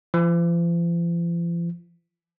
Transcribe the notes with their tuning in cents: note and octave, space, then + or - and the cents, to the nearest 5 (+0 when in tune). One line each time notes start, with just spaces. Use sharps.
F3 -45